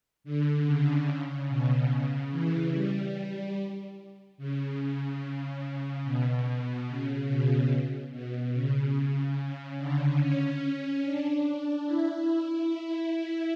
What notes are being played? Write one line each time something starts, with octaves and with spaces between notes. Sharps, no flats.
D3
C#3
B2
C#3
E3
G3
C#3
C#3
B2
C#3
B2
B2
C#3
D3
C#4
D4
E4
E4
E4